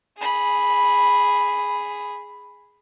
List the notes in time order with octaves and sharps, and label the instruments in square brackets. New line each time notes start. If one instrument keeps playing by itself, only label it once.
[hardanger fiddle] G#4 B5